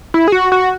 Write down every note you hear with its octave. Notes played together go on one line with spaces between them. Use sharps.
E4
G#4
F#4
F#4